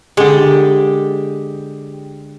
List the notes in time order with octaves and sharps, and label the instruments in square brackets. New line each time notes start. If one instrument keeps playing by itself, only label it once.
[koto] D3 G#3 [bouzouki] G4